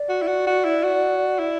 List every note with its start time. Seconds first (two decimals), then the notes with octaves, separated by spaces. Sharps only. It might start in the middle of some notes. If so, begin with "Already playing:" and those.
Already playing: D5
0.09 F#4
0.22 E4
0.27 F#4
0.47 F#4
0.65 E4
0.84 F#4
1.39 E4